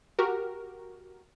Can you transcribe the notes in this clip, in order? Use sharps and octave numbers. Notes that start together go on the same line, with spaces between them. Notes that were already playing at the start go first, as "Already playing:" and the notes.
F#4 G4 A#4